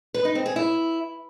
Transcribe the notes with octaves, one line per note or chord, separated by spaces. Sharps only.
B4
D#4
C4
G#4
E4